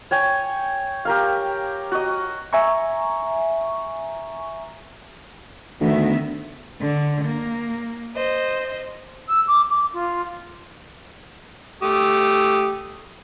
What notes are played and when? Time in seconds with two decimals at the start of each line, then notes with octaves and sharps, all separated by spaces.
0.11 C#5 G5 G#5
1.05 G4 A#4 F5
1.92 F#4 D#5
2.53 E5 G#5 A#5 C#6
5.81 D2 D#3 B3 E5
6.80 D3
7.26 A#3
8.14 C5 D#5
9.29 E6
9.48 D6
9.69 D6
9.94 F4
11.83 A3 G4 D#6